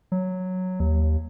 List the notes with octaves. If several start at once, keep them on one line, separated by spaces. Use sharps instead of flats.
F#3
D#2